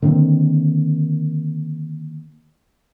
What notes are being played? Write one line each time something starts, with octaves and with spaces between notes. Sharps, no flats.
D3 D#3 A#3 C4